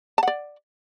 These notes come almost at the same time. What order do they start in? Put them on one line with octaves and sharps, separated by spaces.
A5 F#5 D5